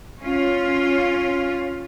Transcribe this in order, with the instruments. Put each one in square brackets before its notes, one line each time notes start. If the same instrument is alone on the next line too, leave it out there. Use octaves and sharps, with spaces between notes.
[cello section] C#4 F4